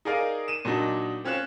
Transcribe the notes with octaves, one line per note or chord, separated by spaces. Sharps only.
D#4 G#4 A#4 D5 F5 G#5
D#7 E7
A#2 F#3 D4 D#4
C4 C#4 F4 F#6 E7